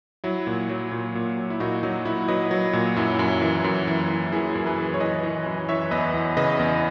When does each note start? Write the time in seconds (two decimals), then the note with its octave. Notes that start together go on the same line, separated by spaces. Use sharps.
0.24 F#3 E4
0.47 A#2
0.69 F#3
0.92 A#2
1.15 A#2
1.37 F#3
1.50 E4
1.60 A#2 D#4 F#4
1.83 F#3 D#4
2.05 A#2 E4
2.28 F#3 B4 D#5
2.51 F#3
2.73 A#2
2.96 F#2 E4
3.19 F#2
3.42 E3
3.64 F#2
3.87 E3
4.10 E3
4.32 E3 E4 G#4
4.55 F#2
4.67 G#4 B4
4.78 E3
4.94 C#5
5.00 E3 B4 D#5
5.23 E3
5.46 F#2
5.69 E3 C#5 E5
5.91 E2 B4 D#5
6.14 E2
6.37 C#3 B4 D#5
6.59 E2